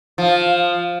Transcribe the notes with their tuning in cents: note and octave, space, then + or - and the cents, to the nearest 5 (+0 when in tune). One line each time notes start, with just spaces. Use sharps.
F3 +5